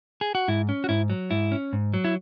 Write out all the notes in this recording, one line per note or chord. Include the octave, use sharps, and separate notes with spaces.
G#4
F#4
G#2 E4
C#4
F#4
G#2 E4
F#3
G#2 E4
C#4
G#2
F#3
E4